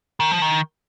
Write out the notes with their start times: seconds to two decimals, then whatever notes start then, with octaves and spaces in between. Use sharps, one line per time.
0.20 D#3
0.32 F3
0.42 D#3